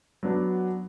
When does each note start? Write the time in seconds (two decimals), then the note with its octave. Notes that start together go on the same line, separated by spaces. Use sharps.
0.23 F#3 B3 D4